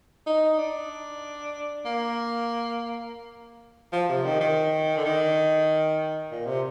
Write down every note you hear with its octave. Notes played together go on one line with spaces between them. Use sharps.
D#4
D4
A#3
F3
C3
D#3
D#3
D3
D#3
A#2
C3